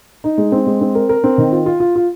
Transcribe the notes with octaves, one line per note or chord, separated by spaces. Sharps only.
D#4
G#3
C4
G#3
C4
A#4
A#4
C4
D#3
F4
F4
F4
F4